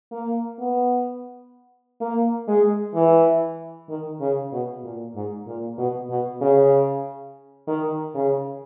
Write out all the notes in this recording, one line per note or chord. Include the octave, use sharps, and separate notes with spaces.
A#3
B3
A#3
G#3
E3
D#3
C#3
B2
A#2
G#2
A#2
B2
B2
C#3
D#3
C#3